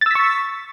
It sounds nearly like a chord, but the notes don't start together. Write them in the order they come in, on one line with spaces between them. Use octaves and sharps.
A6 E6 B6 C#6